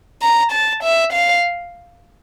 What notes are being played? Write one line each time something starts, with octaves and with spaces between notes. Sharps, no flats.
A#5
A5
E5
F5